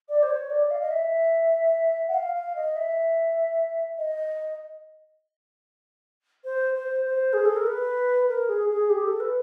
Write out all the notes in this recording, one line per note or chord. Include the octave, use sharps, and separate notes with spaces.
D5
C5
C#5
D5
F5
D#5
E5
F#5
F5
F5
D#5
E5
D#5
C5
C5
C5
G#4
A4
A#4
B4
A#4
G#4
G#4
G4
A4
B4